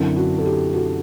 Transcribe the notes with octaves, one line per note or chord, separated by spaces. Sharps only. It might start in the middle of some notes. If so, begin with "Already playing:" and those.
Already playing: F#2 D3 F#3 C4 E4
D4 F#4
A4
E4 G4
F#4 A4